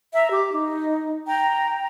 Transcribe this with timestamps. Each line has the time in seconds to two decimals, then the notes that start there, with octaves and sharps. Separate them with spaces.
0.15 E5 A#5
0.31 G4 D6
0.53 D#4
1.26 G5 A#5